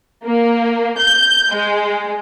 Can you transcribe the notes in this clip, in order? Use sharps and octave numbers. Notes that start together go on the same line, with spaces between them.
A#3
G6
G#3